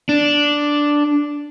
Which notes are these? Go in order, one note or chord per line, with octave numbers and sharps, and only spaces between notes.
D4